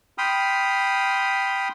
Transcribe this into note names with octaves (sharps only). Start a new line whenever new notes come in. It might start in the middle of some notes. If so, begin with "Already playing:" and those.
G5 B5 C6 D#6 F6